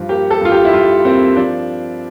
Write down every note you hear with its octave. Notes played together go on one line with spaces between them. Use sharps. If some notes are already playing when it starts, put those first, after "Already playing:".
Already playing: G2 F3
A#3 G4
A4
G2 F4
G4
E4
G2 F4
A#3 C4
F3 D4